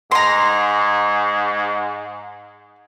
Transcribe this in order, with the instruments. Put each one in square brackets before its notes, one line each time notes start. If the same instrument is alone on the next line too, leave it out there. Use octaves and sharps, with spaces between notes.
[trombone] G#2 [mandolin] A#5 C6